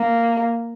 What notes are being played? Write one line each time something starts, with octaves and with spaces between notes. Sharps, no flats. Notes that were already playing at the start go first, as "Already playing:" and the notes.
Already playing: A#3